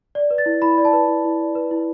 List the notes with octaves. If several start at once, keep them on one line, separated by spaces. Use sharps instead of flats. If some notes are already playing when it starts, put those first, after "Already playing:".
D5
B4
A6
E4
E4 B5
D5
A5
B4
E4
E4
D5
B4
E4